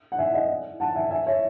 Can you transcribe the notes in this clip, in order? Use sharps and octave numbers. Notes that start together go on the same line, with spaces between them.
F#5
E5 G#5
D#5 F#5
F#5 A5
E5 G#5
E5 G#5
C#5 E5